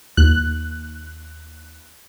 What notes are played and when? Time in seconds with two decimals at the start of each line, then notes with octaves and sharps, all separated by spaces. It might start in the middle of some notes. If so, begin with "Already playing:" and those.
0.17 D#2 F#6